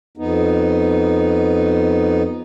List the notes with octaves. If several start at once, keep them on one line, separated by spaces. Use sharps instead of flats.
F2 B3 D#4